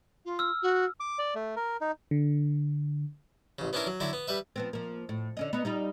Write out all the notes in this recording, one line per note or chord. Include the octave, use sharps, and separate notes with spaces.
F4
E6 F6
F#4
D6
D5
A3
A#4
D#4
D3
A1 C#3
B3 C#4 D4 E4 A#4
F#3
D3 F#3 E4 D5
B3
G3 B4 E5
F3 B3 C4
F3 A#3
A2
D3 C#4 D#5
B3 D#4
G3 D#4 F4